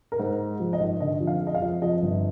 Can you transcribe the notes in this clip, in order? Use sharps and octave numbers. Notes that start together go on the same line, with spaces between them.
A#4
G#2 C5
G#3
F3
D#5
G#1
D3 D#5
F2
F5
G#3
D#5
F5
F2
F2 D#5
G1